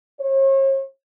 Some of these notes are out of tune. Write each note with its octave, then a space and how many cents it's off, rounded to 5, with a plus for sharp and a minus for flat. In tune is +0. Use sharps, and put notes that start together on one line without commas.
C#5 -40